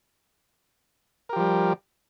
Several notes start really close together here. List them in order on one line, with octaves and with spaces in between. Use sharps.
A#4 G4 F3 G3